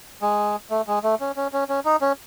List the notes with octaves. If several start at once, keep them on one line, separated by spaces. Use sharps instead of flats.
G#3
A3
G#3
A3
C#4
C#4
C#4
C#4
D#4
C#4